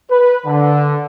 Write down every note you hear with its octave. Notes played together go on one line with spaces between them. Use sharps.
B4
D3